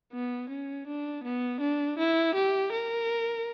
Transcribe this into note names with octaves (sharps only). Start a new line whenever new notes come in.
B3
C#4
D4
B3
D4
E4
G4
A#4